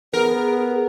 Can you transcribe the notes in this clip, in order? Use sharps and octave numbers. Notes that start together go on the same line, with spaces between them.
B3 G#4 A#4